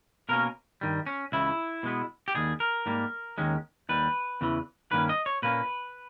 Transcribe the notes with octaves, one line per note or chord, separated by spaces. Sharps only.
B2 A#3 C#4 A#4
G2 D#3 G3
C#4
C#2 C#3 E3 E4
B2 G#3 B3
G4
D#2 D#3 G3 G#4
A#4
G#2 G3 A#3
D#2 D#3 G#3 C#4
D#2 D#3 G3 B4
E2 C#3 E3
G2 D#3 A#3 C#4 B4
D#5
C#5
A#2 A#3 C#4 B4